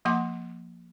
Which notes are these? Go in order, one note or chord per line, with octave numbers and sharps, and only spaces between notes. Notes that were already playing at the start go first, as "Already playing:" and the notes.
F3 A#3 F#5 C6 D6